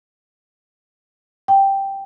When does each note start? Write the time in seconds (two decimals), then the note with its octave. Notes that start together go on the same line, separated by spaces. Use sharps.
1.48 G5